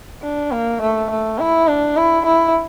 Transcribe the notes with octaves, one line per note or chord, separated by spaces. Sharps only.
D4
A#3
A3
A3
E4
D4
E4
E4